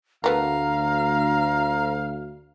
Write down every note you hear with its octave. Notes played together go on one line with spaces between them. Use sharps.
D2 A3 B3 A#4 F5 A#5